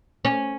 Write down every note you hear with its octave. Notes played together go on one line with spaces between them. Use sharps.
C#4